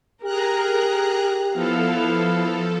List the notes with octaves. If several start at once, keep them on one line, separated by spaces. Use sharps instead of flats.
G4 G#4 A#4 A#5 F#6
F3 B3 E4 A4 F5